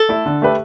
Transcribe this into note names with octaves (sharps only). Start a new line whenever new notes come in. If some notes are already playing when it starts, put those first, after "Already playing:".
Already playing: A4
A3 E4
D3
A3 G4 B4